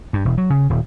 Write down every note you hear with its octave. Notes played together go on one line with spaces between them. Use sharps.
G2
E1
F#3
C#3
D#1